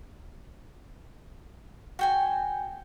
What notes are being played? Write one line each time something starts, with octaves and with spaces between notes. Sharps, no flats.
F#4 G5 G#5